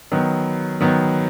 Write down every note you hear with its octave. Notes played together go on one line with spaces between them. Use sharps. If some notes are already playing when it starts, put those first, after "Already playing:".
D#3 F#3 B3
D#3 F#3 B3